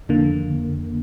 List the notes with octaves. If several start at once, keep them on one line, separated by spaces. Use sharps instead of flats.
F2 D3 A#3